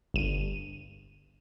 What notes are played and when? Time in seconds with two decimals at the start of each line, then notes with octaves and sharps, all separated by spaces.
0.14 G1 D#7